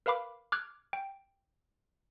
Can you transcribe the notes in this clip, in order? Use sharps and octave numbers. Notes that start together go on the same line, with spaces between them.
A#4 B4 F5 B5 D6
D6 F6 F#6 G#6
G5